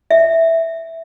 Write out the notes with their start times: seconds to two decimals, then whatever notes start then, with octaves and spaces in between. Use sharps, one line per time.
0.11 E5